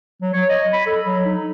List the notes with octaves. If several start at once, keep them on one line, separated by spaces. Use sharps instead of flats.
F#3
C#5
D#5
B5
A4
F#3
D#4